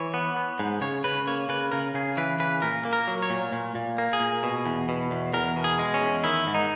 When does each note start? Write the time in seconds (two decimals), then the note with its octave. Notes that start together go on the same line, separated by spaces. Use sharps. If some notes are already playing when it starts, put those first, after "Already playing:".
Already playing: E3 C#5
0.14 B3
0.37 B3
0.59 G#2
0.81 C#3 C#5
1.04 C#3 B4
1.27 A#3 C#5
1.49 C#3 B4
1.72 C#3 A#4
1.94 C#3 G#4
2.17 E3 B4
2.40 C#3 B4
2.62 A#2 A#4
2.85 A#3
2.93 A#4
3.08 F#3
3.22 C#5
3.30 A#2
3.53 A#2
3.75 A#2
3.98 A#3
4.13 G#4
4.20 A#2
4.43 B2
4.66 E2
4.89 B2
5.11 E2
5.33 E2 A#4
5.56 B2
5.64 G#4
5.79 G#3
5.94 C#4
6.01 E2
6.24 D#3 E4
6.47 G#2
6.54 D#4